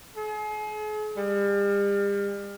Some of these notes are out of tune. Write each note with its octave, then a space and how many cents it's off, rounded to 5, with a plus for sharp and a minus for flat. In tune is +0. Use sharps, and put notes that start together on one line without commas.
G#4 +40
G3 +40